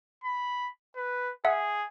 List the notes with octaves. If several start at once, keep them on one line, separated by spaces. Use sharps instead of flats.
B5
B4
G#4 E5 F#5